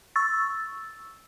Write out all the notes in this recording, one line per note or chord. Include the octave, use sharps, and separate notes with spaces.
C#6 E6 A6